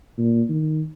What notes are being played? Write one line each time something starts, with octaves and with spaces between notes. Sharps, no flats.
A#2
D#3